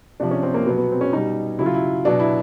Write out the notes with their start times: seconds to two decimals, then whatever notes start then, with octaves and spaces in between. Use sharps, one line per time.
0.20 C3 F3 D4
0.31 C#4
0.43 C4
0.54 A#3
0.66 B2 F#3 B3
0.78 B3
0.92 C4
1.01 C#4
1.13 B2 G3 D#4
1.58 C#3 F#3 E4
1.66 F4
1.74 E4
2.05 B2 F#3 D4
2.20 E4